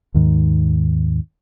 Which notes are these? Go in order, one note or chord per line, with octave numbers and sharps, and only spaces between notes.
D#2 G#2 D#3